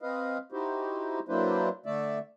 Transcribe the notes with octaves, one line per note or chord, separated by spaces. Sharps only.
C4 B4 D#5 F5
D#4 E4 F#4 G4 C5
F#3 A#3 D4 E4 B4 C5
D3 A3 D5 E5